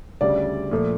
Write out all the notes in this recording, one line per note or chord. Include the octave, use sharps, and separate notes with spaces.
D2 C#3 G3 D5
A#2 F3 A3